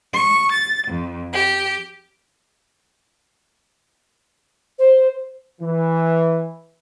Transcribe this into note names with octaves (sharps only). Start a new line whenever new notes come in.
C#6
A6
F2
G4
C5
E3